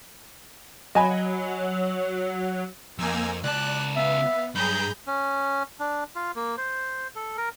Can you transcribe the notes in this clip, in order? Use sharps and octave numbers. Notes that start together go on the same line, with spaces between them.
F#3 D#5 G#5 B5
F2 A#3 D#4 G#5 E6
C#2 D5 A5 F#6
B3 E5 F5
G2 F#3 G#4 A#5 B5 G6
C#4
D4
F4
A#3
C5
A4
A#4